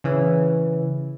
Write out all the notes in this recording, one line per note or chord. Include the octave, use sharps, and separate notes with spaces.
C#3 E3